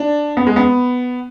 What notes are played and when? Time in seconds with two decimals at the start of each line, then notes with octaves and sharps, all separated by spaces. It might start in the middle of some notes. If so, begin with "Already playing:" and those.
Already playing: D4
0.37 B3
0.47 G#3
0.56 B3